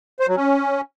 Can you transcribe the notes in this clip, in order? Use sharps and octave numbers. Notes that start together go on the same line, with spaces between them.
C5
F#3
C#4